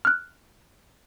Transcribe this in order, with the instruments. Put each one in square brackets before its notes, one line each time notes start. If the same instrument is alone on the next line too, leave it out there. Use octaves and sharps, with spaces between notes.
[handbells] F6 F#6